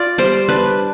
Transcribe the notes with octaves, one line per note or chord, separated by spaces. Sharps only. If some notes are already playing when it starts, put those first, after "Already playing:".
Already playing: F4 D5
G3 C5
D4 B4